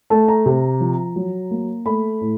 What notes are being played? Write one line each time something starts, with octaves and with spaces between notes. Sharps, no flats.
A3 A5
A#5
C3
F3
F#3
A#3
A3 B5
A2